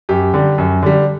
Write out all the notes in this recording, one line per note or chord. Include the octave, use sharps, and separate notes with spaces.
F#2 G4
D3 G3
F#2
D3 G3